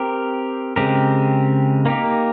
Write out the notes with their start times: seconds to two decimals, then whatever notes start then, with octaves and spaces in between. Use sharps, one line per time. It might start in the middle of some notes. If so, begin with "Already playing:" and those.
Already playing: C4 G4 A#4
0.76 C#3 G#3 C4 G4 A#4
1.86 A#3 D#4 G4 A#4